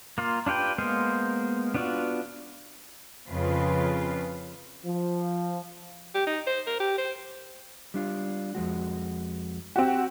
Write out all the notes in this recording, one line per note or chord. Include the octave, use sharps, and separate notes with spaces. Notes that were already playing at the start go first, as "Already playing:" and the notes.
A#3 F4
D4 F4 G4 B4 G5
G#3 A#3 B3 C5 F5
B3 D4 F4 F#4
F2 C#3 F4 B4
F3
G4
D#4
C5
A#4
G4
C5
G3 D4 F4
F2 G#3 F#4
C4 F#4 G4